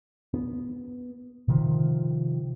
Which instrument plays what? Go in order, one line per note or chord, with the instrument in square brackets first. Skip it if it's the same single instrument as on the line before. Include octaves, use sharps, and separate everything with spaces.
[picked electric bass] B3
C3 D#3 F3